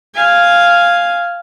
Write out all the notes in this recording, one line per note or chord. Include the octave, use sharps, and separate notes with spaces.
F5 G#5